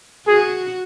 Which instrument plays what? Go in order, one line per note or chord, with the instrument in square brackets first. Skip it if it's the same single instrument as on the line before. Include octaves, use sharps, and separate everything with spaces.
[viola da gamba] F#4 [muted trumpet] G#4